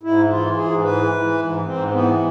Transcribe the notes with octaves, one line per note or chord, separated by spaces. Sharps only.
G#2 E4
E3 F4
G#2 G#4
E3 B4
E3
G#2
G#2 C4
E3 B3